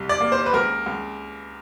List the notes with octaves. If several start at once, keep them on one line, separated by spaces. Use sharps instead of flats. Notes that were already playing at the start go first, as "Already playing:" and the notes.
Already playing: C2
D5
A#3
C5
B4
C#2 A#4
C#2